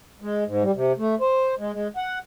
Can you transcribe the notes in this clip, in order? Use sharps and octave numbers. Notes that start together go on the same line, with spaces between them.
G#3
G#2
G3
C3
A3
C5
G#3
G#3
F#5